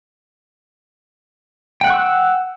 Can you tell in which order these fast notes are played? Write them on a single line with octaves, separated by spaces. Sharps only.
G5 F#5 F#6 C#6 E6